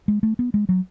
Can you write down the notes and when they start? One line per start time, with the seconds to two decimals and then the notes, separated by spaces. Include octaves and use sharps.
0.08 G#3
0.23 A3
0.39 B3
0.54 G#3
0.69 F#3